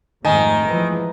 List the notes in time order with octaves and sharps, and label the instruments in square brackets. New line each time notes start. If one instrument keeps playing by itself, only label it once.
[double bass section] F2 G#2 A3 [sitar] D#3 [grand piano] D#5 G#5
[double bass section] E3 F3 G#3